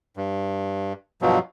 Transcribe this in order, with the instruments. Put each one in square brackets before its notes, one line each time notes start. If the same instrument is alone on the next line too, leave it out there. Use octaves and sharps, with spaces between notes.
[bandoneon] G2
G2 B2 F3 F#3